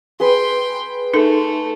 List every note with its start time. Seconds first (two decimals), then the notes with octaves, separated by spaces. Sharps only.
0.20 G#4 B4 G5 C6
1.14 A3 D#4 A4 A#4